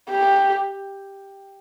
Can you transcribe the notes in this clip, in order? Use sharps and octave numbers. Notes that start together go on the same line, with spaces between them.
G4